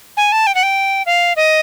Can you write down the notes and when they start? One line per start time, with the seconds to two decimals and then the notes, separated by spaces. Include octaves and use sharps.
0.17 G#5
0.32 A5
0.47 G5
0.55 F#5
0.63 G5
1.06 F5
1.36 D#5